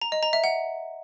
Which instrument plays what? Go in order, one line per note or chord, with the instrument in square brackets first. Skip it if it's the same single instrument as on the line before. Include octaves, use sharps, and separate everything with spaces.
[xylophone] A#5
D#5
A#5
E5
F#5